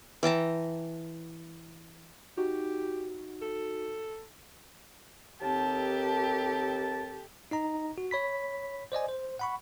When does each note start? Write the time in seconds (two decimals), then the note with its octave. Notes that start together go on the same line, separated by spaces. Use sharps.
0.23 E3 G5 A5 A#5
2.37 D#4 F#4 G4
3.42 A4
5.41 D#2 C4 G4 A4 A5
7.51 D#4 D#5 A#5
7.98 F#4
8.11 C#5 B5 B6
8.92 C5 D5 D#5 G#5
9.09 C5
9.39 F#5 B5 C#6